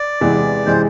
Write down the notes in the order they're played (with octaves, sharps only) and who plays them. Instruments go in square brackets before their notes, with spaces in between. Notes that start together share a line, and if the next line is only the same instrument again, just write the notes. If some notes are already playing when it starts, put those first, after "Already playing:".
Already playing: [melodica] D5
[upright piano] E2 C3 E3 G#3
[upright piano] C3 E3 G#3 [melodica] C5